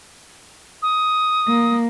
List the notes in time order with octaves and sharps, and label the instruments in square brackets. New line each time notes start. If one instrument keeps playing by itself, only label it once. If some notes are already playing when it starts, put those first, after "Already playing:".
[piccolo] D#6
[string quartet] A#3